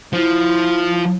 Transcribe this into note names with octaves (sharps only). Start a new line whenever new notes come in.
F3 E4